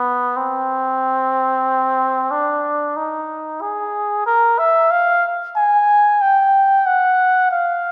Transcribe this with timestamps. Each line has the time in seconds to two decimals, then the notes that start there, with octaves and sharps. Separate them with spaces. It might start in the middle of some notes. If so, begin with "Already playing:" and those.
Already playing: B3
0.37 C4
2.31 D4
2.96 D#4
3.61 G#4
4.26 A#4
4.58 E5
4.91 F5
5.56 G#5
6.21 G5
6.86 F#5
7.51 F5